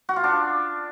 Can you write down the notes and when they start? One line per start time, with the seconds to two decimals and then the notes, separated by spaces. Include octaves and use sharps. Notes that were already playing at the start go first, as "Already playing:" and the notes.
0.09 F#4
0.16 F4
0.24 D4